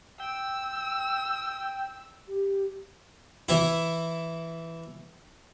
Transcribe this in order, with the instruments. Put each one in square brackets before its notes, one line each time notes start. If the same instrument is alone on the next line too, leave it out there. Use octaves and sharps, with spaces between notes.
[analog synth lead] G5 [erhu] E6
[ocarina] G4
[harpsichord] E3 E4